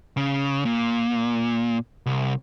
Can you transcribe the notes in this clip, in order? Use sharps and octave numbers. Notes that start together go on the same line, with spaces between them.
C#3
A#2
C2